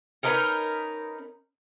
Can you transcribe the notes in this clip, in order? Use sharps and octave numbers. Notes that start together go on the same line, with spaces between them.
C#4 D#4 A#4 B4